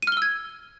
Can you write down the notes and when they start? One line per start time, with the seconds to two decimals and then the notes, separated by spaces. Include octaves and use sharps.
0.02 D#7
0.07 F6
0.12 G7
0.17 E6
0.22 G#6